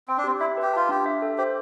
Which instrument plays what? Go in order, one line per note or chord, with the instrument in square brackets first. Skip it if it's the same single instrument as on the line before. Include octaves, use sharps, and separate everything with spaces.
[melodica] C4 [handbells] G5
[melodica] D4
[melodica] C4 [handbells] G4
[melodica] E4 [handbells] E5
[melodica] G4 [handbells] B4
[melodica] F4 [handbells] A5
[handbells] D4 [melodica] G4
[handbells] E5
A4
[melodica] G4 [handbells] C5